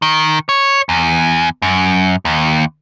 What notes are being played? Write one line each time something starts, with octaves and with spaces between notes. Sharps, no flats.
D#3
C#5
E2
F#2
D#2